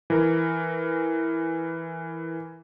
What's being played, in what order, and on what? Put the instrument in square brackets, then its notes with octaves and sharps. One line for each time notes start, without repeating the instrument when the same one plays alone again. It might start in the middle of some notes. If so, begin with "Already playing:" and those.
[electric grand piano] E3 A#4